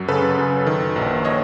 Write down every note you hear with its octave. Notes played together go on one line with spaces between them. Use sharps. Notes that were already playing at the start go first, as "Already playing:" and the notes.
Already playing: F#2 F#3
C#3 A4 B4
F#2
D#3
A#1
C#5 D#5